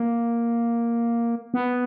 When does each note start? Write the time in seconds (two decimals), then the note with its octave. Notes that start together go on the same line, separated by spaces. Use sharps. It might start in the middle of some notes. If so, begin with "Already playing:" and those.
Already playing: A#3
1.54 B3